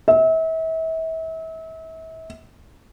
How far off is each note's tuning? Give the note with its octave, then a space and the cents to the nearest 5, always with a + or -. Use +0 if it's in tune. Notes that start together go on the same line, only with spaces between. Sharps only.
E5 -35